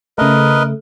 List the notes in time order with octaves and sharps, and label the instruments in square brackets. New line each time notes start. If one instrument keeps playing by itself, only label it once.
[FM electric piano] C#3 A3 [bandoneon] A#4 B4 D#5